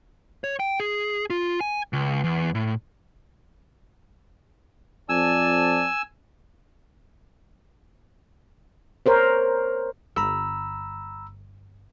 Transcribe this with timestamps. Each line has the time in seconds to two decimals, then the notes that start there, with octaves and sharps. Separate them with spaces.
0.44 C#5
0.60 G5
0.80 G#4
1.30 F4
1.60 G#5
1.93 C#2
2.24 E2
2.55 A2
5.09 F2 D5 G#5 A5 E6
9.06 A#4 C5 C#5
10.16 G1 A#5 B5 E6